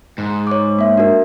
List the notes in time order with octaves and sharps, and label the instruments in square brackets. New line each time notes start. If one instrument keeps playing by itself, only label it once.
[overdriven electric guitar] G#2
[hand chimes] C#5 D6
A#3 E5
D4 F#4 A#4